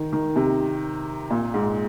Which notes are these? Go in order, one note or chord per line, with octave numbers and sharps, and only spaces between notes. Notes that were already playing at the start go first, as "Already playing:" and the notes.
Already playing: D#3
D#3
C3
A#2
G#2